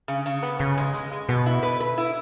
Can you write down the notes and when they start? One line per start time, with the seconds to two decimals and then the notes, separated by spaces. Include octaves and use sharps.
0.08 C#3
0.26 C#3
0.43 B3
0.59 C#3 B3
0.78 G#3
0.94 G#3
1.12 G#3
1.29 B2 B3
1.46 E4
1.63 B4
1.80 B4
1.98 E4